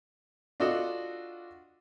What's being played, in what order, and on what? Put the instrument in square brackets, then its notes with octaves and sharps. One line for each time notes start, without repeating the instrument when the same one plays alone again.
[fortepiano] D4 F4 F#4 A4 D#5 F#5